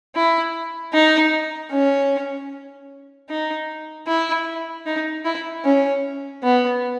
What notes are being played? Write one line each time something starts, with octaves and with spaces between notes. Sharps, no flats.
E4
D#4
C#4
D#4
E4
D#4
E4
C#4
B3